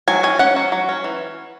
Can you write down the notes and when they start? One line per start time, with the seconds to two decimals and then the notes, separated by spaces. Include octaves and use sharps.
0.08 F#3 G#5
0.23 C#4 G#5
0.39 C#4 F#5
0.56 F#3
0.72 F#3
0.89 C#4
1.04 E3